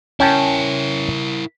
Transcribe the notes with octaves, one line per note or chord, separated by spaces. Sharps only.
C#4 E4 A#4 G5 A5